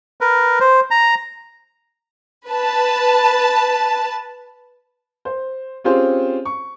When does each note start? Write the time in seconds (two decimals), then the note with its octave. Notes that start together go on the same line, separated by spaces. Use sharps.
0.21 A#4 B4
0.60 C5
0.91 A#5
2.49 B4 A5
5.25 C5
5.84 C4 C#4 F4 G4 G#4 C5
6.45 C#6